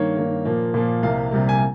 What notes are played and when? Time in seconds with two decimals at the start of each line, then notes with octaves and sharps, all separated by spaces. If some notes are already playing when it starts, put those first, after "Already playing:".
Already playing: G2 D#3 A#3 C#5
0.17 G2 D#3 A#3
0.45 A#2 F3 A#3
0.74 A#2 F3 A#3
1.03 C2 C3 G3 A#3 F5
1.31 C2 C3 G3 A#3
1.49 G#5